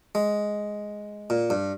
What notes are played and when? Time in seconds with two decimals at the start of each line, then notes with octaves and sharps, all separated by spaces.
0.15 G#3
1.30 A#2
1.50 G2